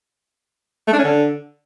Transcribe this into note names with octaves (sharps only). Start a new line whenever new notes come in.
A3
D4
C#4
D3